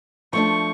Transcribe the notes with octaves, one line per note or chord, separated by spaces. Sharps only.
F3 A3 D4 C#6